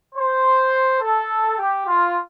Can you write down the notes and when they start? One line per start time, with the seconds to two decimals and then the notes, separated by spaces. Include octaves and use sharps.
0.15 C5
1.00 A4
1.58 G4
1.87 F4